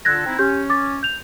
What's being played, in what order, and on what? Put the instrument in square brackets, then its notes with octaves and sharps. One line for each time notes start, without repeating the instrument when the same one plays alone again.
[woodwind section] D3 F4 A4 [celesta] F#6 G#6 A#6
[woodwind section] C4 D#4 E4
[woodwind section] C#4 [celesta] G4 G6
[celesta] D6 A6
G6 F7